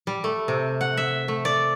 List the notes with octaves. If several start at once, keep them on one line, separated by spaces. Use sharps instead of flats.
G3
A3
C3
F#5
E5
A3
D5